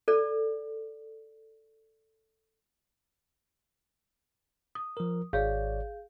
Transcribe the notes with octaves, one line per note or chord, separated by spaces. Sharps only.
A4 D5
D#6
F3 A#4
G#1 G#4 C#5 D5 F5 G6